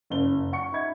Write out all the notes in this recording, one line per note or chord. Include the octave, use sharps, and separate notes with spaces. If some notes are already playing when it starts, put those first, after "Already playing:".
F#1 G7
F#5 C#6 C#7
D#4 E5 B5 G#6